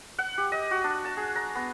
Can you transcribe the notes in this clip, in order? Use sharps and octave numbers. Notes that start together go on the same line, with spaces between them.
F#5
G4
D#5
F#4
D4
A5
G#4
A#5
B3